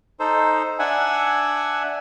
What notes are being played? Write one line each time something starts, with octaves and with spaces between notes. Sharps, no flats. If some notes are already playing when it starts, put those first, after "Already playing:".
D#4 A4 C5
D4 E5 F#5 G#5